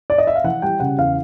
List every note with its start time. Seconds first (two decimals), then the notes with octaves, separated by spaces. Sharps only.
0.10 D5
0.18 D#5
0.27 E5
0.36 F5
0.44 E3 F#5
0.62 G3 G5
0.80 C#3 F#5
0.97 E2 F5